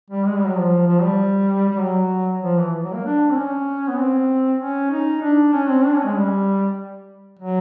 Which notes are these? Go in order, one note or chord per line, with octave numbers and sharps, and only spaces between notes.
G3
G#3
G3
F#3
F3
F3
G3
G3
F#3
F3
E3
F#3
A#3
D4
C4
C#4
B3
C4
C#4
D#4
D4
C#4
C4
D4
C#4
G#3
G3
F#3